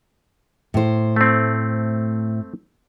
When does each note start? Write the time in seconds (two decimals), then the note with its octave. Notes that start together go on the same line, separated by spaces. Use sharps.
0.74 A2 C5
1.16 A3 C4